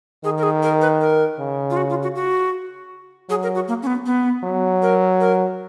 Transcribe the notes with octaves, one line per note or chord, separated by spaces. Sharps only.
D#3 G#4
A#4
G#4
A#4
B4
A#4
C#3
F4
F#4
F4
F#4
F#4
F#3 G#4
A#4
F#4
A#3
C#4
B3
B3
F#3
A#4
A#4